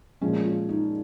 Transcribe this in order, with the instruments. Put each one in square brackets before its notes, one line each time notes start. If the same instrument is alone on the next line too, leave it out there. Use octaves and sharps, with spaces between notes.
[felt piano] A#2 F3 G#3 C#4
F4
D#4